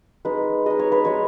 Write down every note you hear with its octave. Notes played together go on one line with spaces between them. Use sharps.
G#3 D#4 B4
G#3 D#4 D#5
C#5
B4
G#3 D#4 C#5